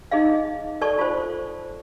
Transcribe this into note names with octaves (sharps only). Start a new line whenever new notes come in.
D#4 G#4 D#5 F5
A4 D5 A5 C#6 D#6
F4 C5